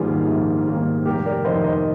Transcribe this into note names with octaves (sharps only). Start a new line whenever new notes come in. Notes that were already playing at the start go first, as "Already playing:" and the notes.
Already playing: A#1 G#2 D#3 G3 A#3 F4 G#4
A#1
G#2 D#3 G3 A#3
F1 G4 A#4
A#4 D5
F2 D#3 C5 D#5
C5 D#5